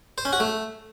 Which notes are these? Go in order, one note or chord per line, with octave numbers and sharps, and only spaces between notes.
C5
C#4
F#4
A3